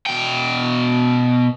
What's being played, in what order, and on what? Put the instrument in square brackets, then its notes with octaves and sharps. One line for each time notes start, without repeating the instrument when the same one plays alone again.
[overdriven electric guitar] B2 G5